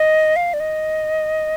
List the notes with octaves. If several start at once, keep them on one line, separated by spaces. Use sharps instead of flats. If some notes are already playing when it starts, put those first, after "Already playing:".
Already playing: D#5
F5
D5
D#5